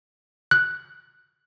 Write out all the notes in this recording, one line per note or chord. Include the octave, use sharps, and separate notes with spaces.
F#6